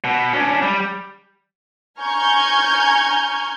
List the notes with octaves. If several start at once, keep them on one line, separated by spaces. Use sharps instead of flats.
B2
C#4 D4
G3
G#5 A#5 C#6 F6 G6 G#6